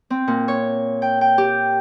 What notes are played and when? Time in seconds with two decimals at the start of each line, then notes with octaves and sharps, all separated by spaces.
0.10 C4
0.28 A#2
0.48 C#5
1.02 G5
1.21 G5
1.38 G4